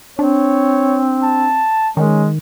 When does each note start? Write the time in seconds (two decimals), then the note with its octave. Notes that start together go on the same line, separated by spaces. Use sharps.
0.19 C4 D4 C#5
1.23 A5
1.97 D#3 G#3 C#4